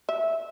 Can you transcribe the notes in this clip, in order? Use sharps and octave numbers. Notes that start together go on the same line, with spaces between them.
E5